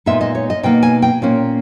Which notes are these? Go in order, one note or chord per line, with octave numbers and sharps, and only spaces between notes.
A#2 G#3 B3 D#4 E5
D#5
C#5
D#5
B2 A#3 D#4 G5
G#5
G5
A#2 A#3 C#4